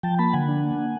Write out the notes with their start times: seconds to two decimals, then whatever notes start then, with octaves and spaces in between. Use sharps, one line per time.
0.03 F3 G5 A5
0.19 A#3 A5 B5
0.33 D3 F#5 G#5
0.49 D4
0.64 A#3
0.79 A#3